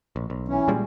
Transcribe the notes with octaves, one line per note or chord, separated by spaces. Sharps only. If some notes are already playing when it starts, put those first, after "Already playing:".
A#1
B1
E3 C#4
A#2 G3 G#3